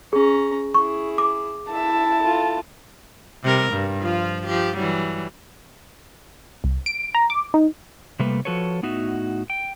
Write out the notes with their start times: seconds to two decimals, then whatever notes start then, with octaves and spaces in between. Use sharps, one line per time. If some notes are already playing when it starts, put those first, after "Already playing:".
0.13 C#4 G#4 A#5
0.74 E4 G#4 C#6
1.18 D6
1.72 E4 E5 A5
2.22 F4 A4
3.43 C3 G3 A#4
3.73 G2
4.02 F3 F4
4.46 F3 G4
4.77 E3 F#3 G3
6.64 C2
6.86 D7
7.15 A#5
7.30 D6
7.54 D#4
8.19 C3 G3 A3 A#3 B4
8.45 F3 F#4 A4 B4 C#5
8.83 A2 B3 D#4 F#4 E5
9.50 G5